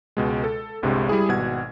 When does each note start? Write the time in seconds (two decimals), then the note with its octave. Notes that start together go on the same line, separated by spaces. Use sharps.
0.17 C#2 B2 G#3
0.44 A4
0.82 G1 C2 G2 C3 G#3
1.09 G3 E4 G#4
1.29 G#1 B2 F#5 G#6